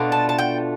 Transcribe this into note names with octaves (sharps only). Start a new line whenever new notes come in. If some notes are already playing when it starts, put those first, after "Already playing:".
Already playing: B2 A3 D4 F4
A5
A5
G5